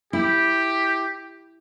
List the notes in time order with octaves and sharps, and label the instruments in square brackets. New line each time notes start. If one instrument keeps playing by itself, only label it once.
[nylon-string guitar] E4 [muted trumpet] G4